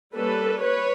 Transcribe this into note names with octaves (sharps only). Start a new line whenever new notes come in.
G3 A#3 C#4 A4 B4
B4 C#5